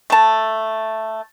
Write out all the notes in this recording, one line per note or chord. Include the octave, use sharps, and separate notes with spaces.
A3 A5